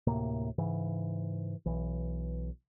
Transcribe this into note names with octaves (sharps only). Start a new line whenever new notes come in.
D2 A2 C3 A#3
G#2 C#3 E3
B1 E3